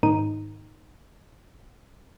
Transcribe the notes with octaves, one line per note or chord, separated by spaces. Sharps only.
G#2 D#3 D#4 D#7